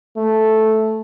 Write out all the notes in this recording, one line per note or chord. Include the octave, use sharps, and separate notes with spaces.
A3